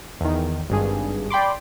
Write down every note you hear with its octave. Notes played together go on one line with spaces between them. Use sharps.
E2 D#3
G#1 G2 G#4
D5 G5 B5 C6 D6